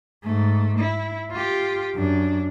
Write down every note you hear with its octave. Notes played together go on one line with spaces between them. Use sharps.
G#2 A3
E4
F4 G4
F#2 D4